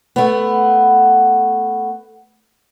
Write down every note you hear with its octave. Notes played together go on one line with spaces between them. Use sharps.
A3 B3